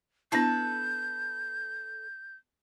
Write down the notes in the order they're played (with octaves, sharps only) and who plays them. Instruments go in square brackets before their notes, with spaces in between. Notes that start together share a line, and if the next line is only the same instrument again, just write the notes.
[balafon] B3 D4 E4 [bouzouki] A4 B4 [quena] G6